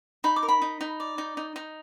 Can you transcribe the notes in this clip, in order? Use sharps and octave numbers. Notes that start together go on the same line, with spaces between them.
D#4 B5
D6
A#4
B5
D#4
D#4
D5
D#4
D#4
D#4